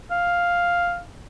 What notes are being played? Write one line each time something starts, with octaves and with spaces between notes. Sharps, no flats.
F5